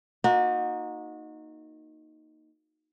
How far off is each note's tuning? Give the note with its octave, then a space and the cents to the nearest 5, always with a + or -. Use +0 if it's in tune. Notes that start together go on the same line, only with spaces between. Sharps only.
A#3 +0 D#4 +0 F#4 -30